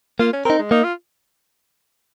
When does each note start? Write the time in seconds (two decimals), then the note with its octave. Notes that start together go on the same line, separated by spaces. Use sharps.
0.20 A#3 F4
0.33 C#4
0.45 C4 D#4 A#4
0.59 G#3
0.71 A#3 D#4
0.84 F4